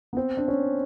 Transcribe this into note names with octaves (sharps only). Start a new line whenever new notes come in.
B3
C4
D4
C#4